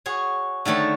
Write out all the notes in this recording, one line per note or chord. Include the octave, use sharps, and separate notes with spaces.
F#4 G#4 C#5
D3 D#3 A3 C#5 D#5